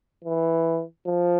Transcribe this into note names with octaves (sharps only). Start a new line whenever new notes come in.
E3
F3